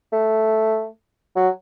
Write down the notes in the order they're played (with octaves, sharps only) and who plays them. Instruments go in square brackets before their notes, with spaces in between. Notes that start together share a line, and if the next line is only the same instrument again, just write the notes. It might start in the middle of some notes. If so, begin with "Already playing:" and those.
[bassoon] A3
F#3